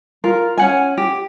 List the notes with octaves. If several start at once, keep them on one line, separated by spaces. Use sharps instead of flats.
F4 A#4
C#4 F#5 G#5
G4